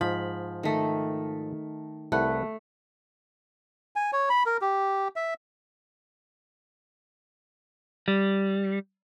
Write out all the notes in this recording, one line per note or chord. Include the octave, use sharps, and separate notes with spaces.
G#2 F3 B5
D#3 A3
C2 A3 B4 F#5
G#5
C#5
B5
A#4
G4
E5
G3